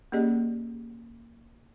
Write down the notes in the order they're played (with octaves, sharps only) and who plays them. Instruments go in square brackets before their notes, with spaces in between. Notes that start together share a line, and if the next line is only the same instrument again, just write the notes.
[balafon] A#3 C#4 G4 G#4 D5 D#5